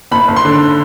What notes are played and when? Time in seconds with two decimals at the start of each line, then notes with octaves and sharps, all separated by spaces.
0.12 F#1 B5
0.28 F#1
0.36 C6
0.45 D3